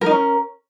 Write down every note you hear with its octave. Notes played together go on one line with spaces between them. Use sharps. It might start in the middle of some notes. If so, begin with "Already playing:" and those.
C#4 D#4 A#4